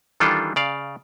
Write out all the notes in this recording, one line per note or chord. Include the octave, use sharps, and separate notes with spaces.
D#3 E3 G3 D4 F4 A4
C#3 D5 F5